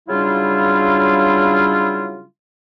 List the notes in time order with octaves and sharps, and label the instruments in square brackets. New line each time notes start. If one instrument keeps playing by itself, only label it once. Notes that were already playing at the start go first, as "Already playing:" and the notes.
[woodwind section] C#3 F#3 G3 D4 E4 F4